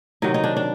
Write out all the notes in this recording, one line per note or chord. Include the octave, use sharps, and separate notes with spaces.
C3 D#3 F#3 D#4
D#4
D4
D4